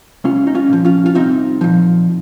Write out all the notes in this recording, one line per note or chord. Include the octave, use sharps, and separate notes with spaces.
C2 C#4 F4
D#4
C#4 F4
A#2 F3
C#4 F4
F4
C2 C4 D#4
A#2 F3